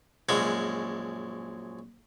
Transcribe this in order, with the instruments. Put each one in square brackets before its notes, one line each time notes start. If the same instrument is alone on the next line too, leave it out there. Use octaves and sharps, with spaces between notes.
[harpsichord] A#1 F#2 G#3 F#4